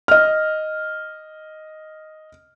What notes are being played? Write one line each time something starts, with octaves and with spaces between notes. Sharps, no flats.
D#5 F6